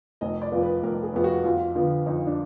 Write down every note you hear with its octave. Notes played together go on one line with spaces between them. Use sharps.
F1 D#5
D5
F2 F3 B3
B4
F1 A#4
G#4
F2 F3 B3
F#4
F2 F4
D3 F3 B3
F2 D#4
D4